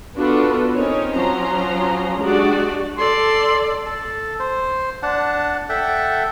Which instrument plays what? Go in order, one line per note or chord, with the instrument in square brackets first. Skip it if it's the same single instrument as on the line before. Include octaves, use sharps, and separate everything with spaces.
[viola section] B3 D4 F4 F#4 A4 B4
C4 C#4 D#4 A#4 C#5
F3 F#3 C#4 A#5 C6
G#3 D4 F#4 G4 D5
[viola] A4 D5 [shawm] C6
[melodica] A4
C5
D4 F#5 A5
A4 E5 F#5 G5